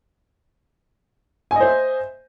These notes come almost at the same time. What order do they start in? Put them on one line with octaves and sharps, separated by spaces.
G#5 D#5 C5 E5